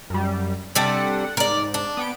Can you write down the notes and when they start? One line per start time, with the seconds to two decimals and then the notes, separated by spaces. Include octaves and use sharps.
0.10 F#2 G3
0.75 C3 G3 D4 A4 F#5
1.37 G#2 A#4 D5
1.74 D4
1.97 B3 G5 D7